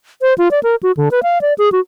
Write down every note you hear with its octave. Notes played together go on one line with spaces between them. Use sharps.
C5
F4
D5
A#4
F#4
D3
B4
F5
D5
G#4
F#4